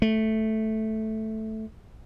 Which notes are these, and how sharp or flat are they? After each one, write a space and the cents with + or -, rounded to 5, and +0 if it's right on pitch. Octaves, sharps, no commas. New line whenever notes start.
A3 -5